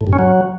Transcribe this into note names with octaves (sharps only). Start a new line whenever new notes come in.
A2
G2
C#4
F#3